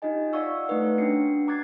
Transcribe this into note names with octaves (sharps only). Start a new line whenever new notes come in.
D#4 F4 G4 D#5 G#5
D5 F5 F#5 C#6 E6
A3 D#4 B4 F#5
C#5
C#4 D4 F#4 C7 C#7
A#5 D6 F#6 G#6 A6 C7